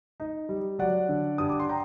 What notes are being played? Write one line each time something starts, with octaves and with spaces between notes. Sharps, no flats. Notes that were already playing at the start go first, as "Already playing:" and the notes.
D#4
G3
F#3 D5 F#5
D3
G2 D#6
D6
C6
G5 A#5